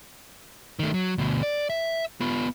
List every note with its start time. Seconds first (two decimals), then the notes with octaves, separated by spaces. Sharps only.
0.79 D#3 A3
0.94 F#3
1.18 D2 B2
1.43 D5
1.70 E5
2.21 B3 F4